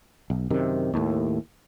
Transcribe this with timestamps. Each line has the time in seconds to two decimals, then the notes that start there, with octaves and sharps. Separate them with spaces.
0.30 B1
0.50 F#2 C3 D#3
0.94 D#2 A2